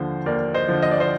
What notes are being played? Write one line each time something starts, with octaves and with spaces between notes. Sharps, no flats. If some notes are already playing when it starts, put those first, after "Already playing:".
Already playing: D#2 D3 F3 C5
D#2 A#4 D5
C5 D#5
D3 F3
D#5
D5
C5 D#5